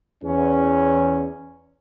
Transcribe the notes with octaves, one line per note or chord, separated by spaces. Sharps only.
E2 C#4